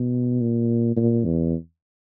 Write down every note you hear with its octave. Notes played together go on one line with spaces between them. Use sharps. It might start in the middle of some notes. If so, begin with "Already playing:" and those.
Already playing: B2
A#2
A#2
E2